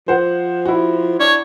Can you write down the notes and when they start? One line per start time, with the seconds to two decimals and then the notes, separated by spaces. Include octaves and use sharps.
0.08 F3 C5 F#5
0.65 E4 F#4
1.20 D4 C#5